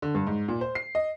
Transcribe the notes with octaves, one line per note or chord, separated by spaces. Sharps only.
D3
G2
G#2
A#2
C5
C7
D#5